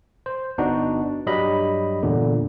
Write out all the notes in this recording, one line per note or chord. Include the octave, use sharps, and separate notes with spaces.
C5
G1 B3 D4 D#4 F#4
G2 F#3 G3 D#5 B5
E2 A#2 D3